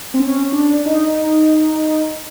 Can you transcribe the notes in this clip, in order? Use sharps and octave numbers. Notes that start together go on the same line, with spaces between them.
C4
C#4
D4
D#4